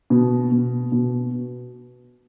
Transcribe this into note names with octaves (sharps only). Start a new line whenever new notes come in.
B2
B2
B2